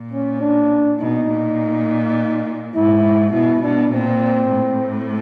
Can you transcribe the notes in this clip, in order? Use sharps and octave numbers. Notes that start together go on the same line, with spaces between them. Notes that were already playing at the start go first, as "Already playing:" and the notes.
Already playing: A#2
C#4
D4
B2 D#4
A#2
G#2 E4
B2 E4
B2 D4
A#2 C4
A2